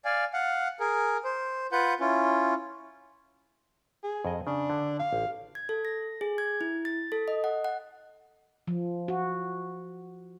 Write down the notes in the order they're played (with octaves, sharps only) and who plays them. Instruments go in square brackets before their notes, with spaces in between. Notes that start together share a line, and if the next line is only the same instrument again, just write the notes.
[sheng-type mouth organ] D5 F5 G#5
F5 F#5
G#4 A#4
C5
F4 B4 F#5 G6
C#4 E4 F4
[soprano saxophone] G#4
[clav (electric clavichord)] F2 D#5
[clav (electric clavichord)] C#3 [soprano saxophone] D4
[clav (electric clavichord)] D3
[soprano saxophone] F5
[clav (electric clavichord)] A1
[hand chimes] G#6
A4
A#6
G#4
G#6
E4
A6
A4
D#5
F#5
F#5
[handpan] F3
F#4